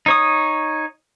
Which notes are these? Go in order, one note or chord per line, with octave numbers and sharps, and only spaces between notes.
D#4 C#5 D#6